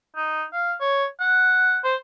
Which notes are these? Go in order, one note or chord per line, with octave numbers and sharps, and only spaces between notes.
D#4
F5
C#5
F#5
C5